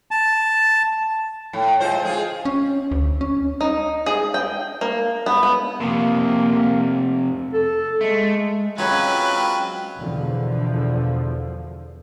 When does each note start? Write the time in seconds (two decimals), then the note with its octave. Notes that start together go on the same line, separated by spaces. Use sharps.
0.11 A5
1.53 A2
1.80 G#3 F4 C5
2.05 F4 G#4
2.45 C#4
2.91 D2
3.21 C#4
3.61 D#4
4.06 G#4
4.34 G5
4.81 A#3
5.26 B3
5.43 B3
5.80 F2 C3 A#3
7.54 A4
8.01 G#3 A3
8.78 F#3 G#3 C4 C#4 F4 B4 G5
9.97 E2 B2 D3 F3